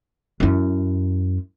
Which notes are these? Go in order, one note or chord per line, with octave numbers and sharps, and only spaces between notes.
F#2 E4